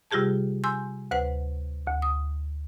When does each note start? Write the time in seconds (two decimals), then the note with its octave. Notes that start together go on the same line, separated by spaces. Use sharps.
0.11 C3 G3 F4 G4 G#4 A5
0.64 G#5 C6 E6 G6
1.11 D2 B4 C5 F#5
1.87 D2
2.02 D#6